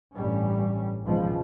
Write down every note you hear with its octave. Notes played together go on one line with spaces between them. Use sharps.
A1 G2 G3 C#4
G#1 C#2 B2 F3 G#3